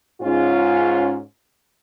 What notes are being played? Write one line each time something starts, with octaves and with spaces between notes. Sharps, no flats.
G#2 C#4 F4